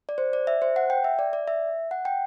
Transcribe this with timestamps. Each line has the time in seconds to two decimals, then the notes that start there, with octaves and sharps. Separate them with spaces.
0.09 D5
0.18 C5
0.33 D5
0.47 E5
0.62 C5
0.76 F#5
0.90 G5
1.04 E5
1.19 D5
1.33 D5
1.48 E5
1.91 F#5
2.05 G5